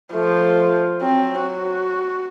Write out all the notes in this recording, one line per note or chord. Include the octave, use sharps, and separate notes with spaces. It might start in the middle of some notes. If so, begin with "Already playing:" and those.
F3 A3
F#3 C4
F#4